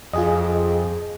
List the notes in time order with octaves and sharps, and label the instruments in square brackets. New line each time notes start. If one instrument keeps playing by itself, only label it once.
[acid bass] F2 [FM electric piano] F4 G#4 D#5